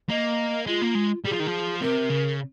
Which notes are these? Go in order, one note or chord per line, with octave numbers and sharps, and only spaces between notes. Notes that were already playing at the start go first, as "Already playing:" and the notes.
A#3 D#5
G#3 F4
A#3
G#3
G3 G#4
F3
D#3
F3
C3 A#4
C#3